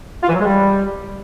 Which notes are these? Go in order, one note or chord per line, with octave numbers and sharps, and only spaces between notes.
F4
E3
F#3
G#3
G3